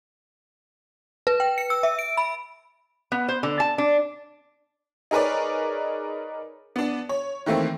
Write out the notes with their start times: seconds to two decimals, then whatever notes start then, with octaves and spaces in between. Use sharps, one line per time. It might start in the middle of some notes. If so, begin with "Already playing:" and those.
1.27 B4
1.40 G5
1.58 C#7
1.70 E6
1.83 E5
1.99 D7
2.17 B5
3.12 B3
3.29 C5
3.43 D3
3.60 A5
3.78 D4
5.11 D#4 G#4 A#4 B4 C#5 D5
6.76 B3 D4
7.09 C#5
7.46 D#3 E3 A3 A#3 C4